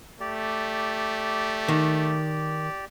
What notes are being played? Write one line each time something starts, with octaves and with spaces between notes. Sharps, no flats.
A3 G4 D5
D#3